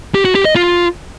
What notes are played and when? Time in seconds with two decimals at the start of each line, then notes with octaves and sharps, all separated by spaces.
0.15 G4
0.25 F#4
0.35 G4
0.45 D#5
0.55 F4